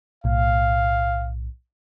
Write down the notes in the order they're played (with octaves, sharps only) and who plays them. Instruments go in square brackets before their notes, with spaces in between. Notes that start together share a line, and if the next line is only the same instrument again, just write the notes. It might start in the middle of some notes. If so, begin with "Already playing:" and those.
[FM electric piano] B1 A2 [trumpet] F5